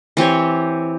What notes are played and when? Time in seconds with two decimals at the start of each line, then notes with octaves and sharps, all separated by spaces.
0.17 E3 C4 G4 C#5